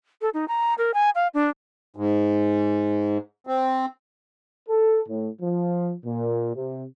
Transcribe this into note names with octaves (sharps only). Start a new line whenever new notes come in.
A4
D#4
A#5
A#4
G#5
F5
D4
G#2
C4
A4
A2
F3
A#2
C3